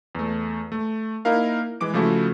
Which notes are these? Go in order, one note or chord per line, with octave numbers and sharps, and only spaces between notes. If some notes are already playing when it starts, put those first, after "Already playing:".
E2 A3
A3
A#3 D#4 E4 A#4 F5
E3 G#3 D6 D7
C#3 F3 A3 E4 F#4 A4